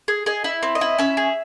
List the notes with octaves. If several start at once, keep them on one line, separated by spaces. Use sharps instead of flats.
G#4
G#4 D#5
E4
C4
D#5
E4
C#4 E5
G#4